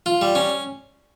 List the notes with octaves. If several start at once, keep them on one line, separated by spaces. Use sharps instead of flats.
F4
G3
C#4